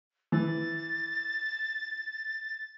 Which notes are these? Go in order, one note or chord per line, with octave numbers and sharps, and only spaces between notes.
E3 A6